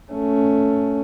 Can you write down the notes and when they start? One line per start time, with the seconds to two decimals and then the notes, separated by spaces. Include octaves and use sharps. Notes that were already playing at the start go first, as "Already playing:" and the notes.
0.12 A3 C#4